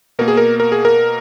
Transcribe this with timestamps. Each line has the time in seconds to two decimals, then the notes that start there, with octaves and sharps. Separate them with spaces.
0.19 B2 A#3 A#4
0.28 G#4
0.37 A#4
0.60 A#4
0.72 G#4
0.85 A#4